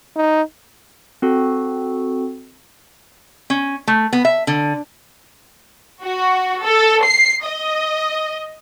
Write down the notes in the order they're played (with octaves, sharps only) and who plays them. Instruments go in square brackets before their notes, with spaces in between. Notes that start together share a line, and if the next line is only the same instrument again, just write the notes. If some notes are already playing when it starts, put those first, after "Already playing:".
[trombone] D#4
[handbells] C4 F#4 A4
[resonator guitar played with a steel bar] C#4
A3
B3
E5
D3
[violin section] F#4
A4
C7
D#5